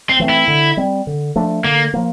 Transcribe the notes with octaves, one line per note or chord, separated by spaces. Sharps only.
C4
E3 A3 C4
E4
D3
G3 C4
D3
F3 A3 D4
D3 A#3
F3 A#3